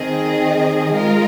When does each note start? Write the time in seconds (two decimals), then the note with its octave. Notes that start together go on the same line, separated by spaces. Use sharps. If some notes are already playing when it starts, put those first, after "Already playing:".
Already playing: D#3 C4 G#4 D#5
0.94 G#3 F4 A#4 D#5